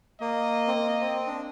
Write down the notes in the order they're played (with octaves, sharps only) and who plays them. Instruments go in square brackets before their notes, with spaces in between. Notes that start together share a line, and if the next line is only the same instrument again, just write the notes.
[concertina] A#3 [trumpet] D#5
[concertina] C4
A#3
C4
D4